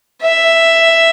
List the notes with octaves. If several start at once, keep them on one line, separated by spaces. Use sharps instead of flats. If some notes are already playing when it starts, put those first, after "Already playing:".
E5